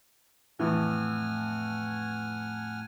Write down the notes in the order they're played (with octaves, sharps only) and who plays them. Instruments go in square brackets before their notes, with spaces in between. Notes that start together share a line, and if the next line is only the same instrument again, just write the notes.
[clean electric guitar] F2 A2 [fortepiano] E3 [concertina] F#5 G#5 F6